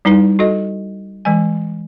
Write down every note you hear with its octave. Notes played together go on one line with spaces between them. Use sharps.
G3 D#4 E4 B4
F#4 A4 D#5
E3 G#3 G#5